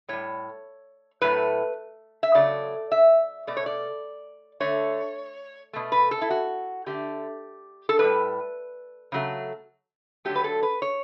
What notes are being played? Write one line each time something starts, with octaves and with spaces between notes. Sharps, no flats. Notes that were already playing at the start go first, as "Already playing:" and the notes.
A2 G3 C#5
A2 F#3 A3 B4
E5
C#3 F#3 A3 D5
E5
B2 A3 D5
C#5
D5
D3 A3 C#5
B2 A3
B4
A4
E4
F#4
D3 A3 G4
A4
A2 G3 B4
C#3 F#3 A3
D3 F#3 A3 G4
B4
A4
B4
C#5